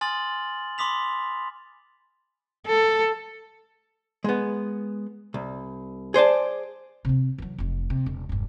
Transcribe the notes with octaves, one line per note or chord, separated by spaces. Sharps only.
G#5 C6 D#6 F6 A6 F#7
B5 C6 D6 D#6 B6 F7
A4
G#3 B3
C2
G#4 C5 D5 A5
C3 C4
E3 F#3
F1 F2
C3
E1
E1 G2